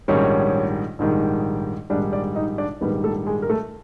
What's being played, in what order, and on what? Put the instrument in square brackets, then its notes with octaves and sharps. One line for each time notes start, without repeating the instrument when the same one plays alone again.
[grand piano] A#1 G#2 D#3 G3 C#4 C#5
A#1 G#2 D#3 G3
A#1 G#2 D#3 G3 D4 D5
D4 D5
D#4 D#5
D4 D5
A#1 G#2 D#3 G3 B3 B4
A3 A4
G#3 G#4
A#4
A3 A4